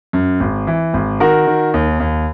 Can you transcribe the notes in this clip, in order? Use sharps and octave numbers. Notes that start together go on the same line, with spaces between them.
F#2
G#1
E3
G#1
D#3 F#4 A#4
D#3
D#2
D#2